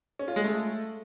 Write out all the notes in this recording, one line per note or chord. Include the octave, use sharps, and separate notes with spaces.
C#4
F4
G#3
A3